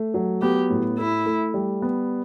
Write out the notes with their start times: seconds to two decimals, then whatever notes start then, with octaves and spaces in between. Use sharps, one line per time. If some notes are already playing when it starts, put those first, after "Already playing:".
Already playing: A3
0.14 F#3
0.42 B3 G4
0.70 A2
0.98 A3 E4
1.26 A3
1.54 G3
1.82 B3